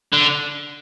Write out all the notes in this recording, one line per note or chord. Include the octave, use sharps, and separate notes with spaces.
D3